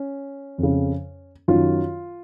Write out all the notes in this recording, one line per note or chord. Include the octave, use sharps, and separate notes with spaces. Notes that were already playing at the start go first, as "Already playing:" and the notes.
Already playing: C#4
F2 C#3
F#2 D#3 F4